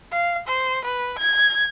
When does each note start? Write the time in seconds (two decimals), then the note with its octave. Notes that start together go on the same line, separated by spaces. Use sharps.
0.12 F5
0.48 C5
0.85 B4
1.19 G#6